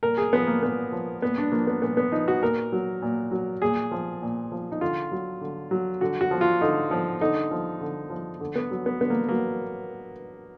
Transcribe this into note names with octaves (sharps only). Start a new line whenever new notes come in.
A#2 A#4
G#4
F3 B3
A#3
A#2 B3
F3
A#2 B3
D4
F3 A#3
B3
A#2 B3
B3
F3 D#4
F#4
A#2 A#4
F#3
A#2
F#3
A#2 G#4
F3
A#2
F3
D#4
D3 F4
F#3
D3
F#3
D3 F#4
F#4
F3
F4
D3 D#4
F3
D3 D#4
F3
D3
F3
D3
B3
F#3
B3
D3 B3
A#3
F#3 A#3